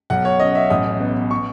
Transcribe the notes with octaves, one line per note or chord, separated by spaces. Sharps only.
B1 F#5
C#5
C#4 D#5
E5
A1 D#6
B3
C#6